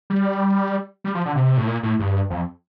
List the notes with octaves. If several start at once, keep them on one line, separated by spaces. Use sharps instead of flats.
G3
G3
F3
D3
C3
A2
A#2
A2
G2
F2